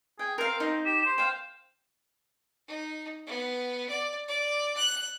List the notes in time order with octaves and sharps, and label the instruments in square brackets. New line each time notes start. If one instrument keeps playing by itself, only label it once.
[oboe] G#4 [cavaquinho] G5
[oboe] C4 [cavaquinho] A#4 F5
[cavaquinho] D#4
[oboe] G4 [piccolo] E7
[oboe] C5
[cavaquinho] F5 G5
[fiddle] D#4
B3
D5
D5
F#6